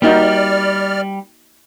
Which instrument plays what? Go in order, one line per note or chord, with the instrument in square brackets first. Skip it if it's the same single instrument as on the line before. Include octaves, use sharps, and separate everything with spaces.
[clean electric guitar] G3 [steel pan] A#3 D#4 F#4 [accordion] D5 F6